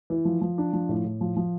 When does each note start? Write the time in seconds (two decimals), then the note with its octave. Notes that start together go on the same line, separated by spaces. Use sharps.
0.10 E3
0.25 F3
0.41 F3
0.58 D4
0.73 F3
0.89 A2
1.04 A2
1.21 F3
1.36 F3